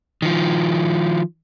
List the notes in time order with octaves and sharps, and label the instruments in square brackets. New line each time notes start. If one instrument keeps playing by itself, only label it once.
[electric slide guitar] D#3 F3